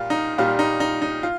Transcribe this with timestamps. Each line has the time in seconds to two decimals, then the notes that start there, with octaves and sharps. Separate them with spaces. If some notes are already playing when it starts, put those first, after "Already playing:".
Already playing: A#2 G3 F4
0.10 D#4
0.38 A#2 G3 F4
0.59 D#4
0.80 D#4
1.02 D#4
1.23 F4